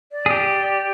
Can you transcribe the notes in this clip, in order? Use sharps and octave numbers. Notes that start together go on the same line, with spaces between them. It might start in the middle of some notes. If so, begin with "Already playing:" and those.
D5
G#4
G4